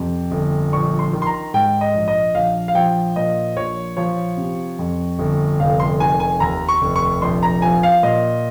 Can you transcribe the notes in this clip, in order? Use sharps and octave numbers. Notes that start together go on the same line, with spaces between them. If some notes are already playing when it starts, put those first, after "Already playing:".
Already playing: F2 C3
G1
A#1 C#6
C6
D#3
C6
A#5
G#2 G5
D#5
A#1
D#5
A#1 F5
F5
F3 G5
A#2 D#5
A#1 C#5
F3 C#5
C3
F2
G1
F1 F5
C6
D#3 G#5
G#5
D#2 A#5
C#6
F1
C#6
A#1 C6
A#5
F3 G#5
F5
A#2 D#5